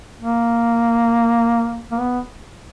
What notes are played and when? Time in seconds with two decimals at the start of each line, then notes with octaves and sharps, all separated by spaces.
0.20 A#3
1.92 A#3
1.99 B3